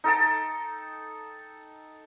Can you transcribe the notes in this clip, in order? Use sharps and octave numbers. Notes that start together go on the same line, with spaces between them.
D#4 A4 G5 A5